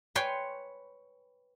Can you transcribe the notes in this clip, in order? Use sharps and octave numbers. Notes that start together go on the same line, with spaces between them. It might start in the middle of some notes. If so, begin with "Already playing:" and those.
B4 C#5 G5 G#5 C6